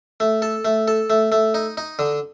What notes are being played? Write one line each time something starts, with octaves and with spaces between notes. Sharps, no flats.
A3
A4
A3
A4
A3
A3
D#4
D#4
D3